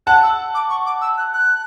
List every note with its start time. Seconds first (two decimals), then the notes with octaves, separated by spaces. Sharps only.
0.07 F#5 A5 F#6
0.23 E6
0.55 D6
0.70 C#6
0.86 D6
1.01 E6
1.18 F#6
1.33 F#6